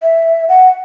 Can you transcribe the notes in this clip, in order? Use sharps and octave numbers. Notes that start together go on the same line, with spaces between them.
E5
F#5